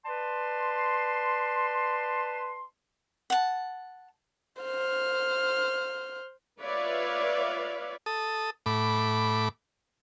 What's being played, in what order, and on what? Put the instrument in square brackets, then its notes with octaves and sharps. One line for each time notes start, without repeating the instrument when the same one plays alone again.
[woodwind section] B4 D5 A5 C6
[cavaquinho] F#5 A5
[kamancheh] C5 F6
[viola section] F4 B4 C#5 D5 E5 F5
[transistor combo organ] A4 D#6
A2 B5 D6